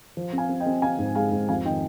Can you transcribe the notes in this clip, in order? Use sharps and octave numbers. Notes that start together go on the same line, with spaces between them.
F3
C4
F5 G#5
C4
D#5 G5
C4
C4 F5 G#5
G#2
G#3 F5 G#5
G#2
F2 F5 G#5
D#3 D#5 G5